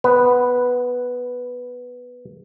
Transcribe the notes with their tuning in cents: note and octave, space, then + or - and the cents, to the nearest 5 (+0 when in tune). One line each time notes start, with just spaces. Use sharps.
B3 +0 B4 +0